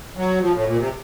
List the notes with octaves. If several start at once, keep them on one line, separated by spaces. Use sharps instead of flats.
F#3
F3
A2
A#2
C3